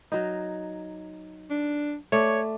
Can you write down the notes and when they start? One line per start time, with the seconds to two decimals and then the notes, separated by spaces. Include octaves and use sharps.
0.12 F#3 D#4
1.50 D4
2.12 A3 C#5 D5